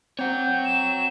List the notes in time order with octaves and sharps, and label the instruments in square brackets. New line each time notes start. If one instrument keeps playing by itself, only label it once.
[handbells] C4 [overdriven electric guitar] C#5 F#5 [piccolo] G6
[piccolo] E7